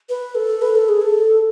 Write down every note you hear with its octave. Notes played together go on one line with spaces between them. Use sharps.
B4
A4
B4
A4
G#4
A4